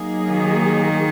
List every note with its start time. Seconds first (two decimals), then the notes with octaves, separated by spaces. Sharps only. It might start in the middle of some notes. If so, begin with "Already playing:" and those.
Already playing: F#3 A#3 D#4 G#4
0.30 D#3